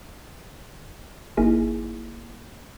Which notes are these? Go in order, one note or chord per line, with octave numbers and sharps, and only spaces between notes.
G1 A#3 D#4 E4 G#4